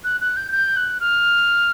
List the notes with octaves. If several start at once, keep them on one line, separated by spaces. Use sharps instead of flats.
F#6
F#6
G6
G6
F#6
F6